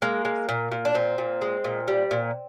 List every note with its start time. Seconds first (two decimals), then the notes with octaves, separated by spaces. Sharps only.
0.02 G#3 A#3
0.25 G#3
0.49 A#2
0.72 A#2
0.85 D4
0.95 A#2 C4
1.18 A#2
1.42 G#3
1.64 A#2
1.88 G3
2.11 A#2